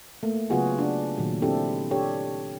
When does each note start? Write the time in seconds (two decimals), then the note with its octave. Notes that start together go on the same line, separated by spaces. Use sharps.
0.23 A3 A#3
0.50 C#3 F#3 B3 F4 F#4 G#4
0.79 D4
1.17 A#2 D#3 F#3
1.42 C4 D4 E4 G4 A4
1.91 D4 G4 A4 C#5